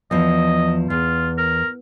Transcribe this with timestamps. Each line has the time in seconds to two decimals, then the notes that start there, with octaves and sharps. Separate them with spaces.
0.11 E2 F3 D#5
0.90 E2 F4
1.38 A#4